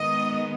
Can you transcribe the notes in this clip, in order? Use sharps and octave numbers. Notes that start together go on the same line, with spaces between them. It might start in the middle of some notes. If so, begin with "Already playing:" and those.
Already playing: D#3 G#3 B3 D#5